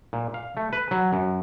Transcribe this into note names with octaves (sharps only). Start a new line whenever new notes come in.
A#2
F5
A3
B4
F#3
F#2